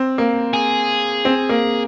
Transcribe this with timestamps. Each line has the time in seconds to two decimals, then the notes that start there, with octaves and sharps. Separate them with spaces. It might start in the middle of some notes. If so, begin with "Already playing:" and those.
Already playing: C4
0.18 A#3
0.54 G#4
1.25 C4
1.49 A#3